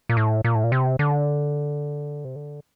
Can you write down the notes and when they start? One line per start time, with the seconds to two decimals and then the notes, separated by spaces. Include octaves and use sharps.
0.09 A#2
0.17 A2
0.44 A#2
0.55 A2
0.64 A#2
0.72 C3
0.99 D3
2.25 C3
2.36 D3